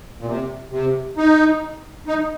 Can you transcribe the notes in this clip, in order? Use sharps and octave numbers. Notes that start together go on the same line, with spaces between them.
A#2
C3
C3
D#4
D#4